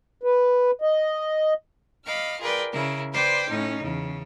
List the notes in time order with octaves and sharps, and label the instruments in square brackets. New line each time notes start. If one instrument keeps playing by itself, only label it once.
[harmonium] B4
D#5
[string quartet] D#5 F5 B5 D6 F6
F4 G#4 A#4 B4 D5 G5
C#3 E4 A#4
B4 C5 D5 G5 C6 D6
A2 C#4 D#4
E2 C#3